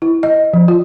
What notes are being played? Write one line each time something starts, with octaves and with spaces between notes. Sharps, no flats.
E4
D#5
F3
F4